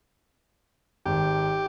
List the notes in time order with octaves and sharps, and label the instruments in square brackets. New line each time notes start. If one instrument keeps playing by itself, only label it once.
[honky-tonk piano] G#1 [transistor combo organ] G4